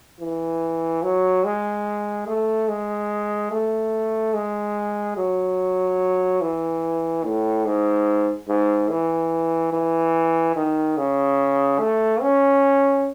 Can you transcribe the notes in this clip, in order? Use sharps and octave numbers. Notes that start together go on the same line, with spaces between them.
E3
F#3
G#3
A3
G#3
A3
G#3
F#3
E3
A2
G#2
G#2
E3
E3
D#3
C#3
A3
C#4